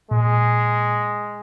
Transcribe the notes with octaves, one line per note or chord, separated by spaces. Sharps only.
A#2 G#3